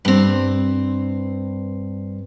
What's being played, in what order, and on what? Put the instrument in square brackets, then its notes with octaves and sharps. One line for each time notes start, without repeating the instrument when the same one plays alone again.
[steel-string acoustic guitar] G2 C4